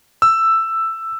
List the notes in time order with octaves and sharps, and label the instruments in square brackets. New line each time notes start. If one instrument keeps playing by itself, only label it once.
[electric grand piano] E6